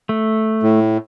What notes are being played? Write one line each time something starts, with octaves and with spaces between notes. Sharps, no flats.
A3
A2